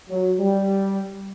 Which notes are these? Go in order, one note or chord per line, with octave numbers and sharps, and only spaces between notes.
F#3
G3